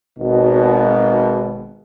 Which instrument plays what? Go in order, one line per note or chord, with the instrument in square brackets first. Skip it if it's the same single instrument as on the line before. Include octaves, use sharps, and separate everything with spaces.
[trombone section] G#1 B2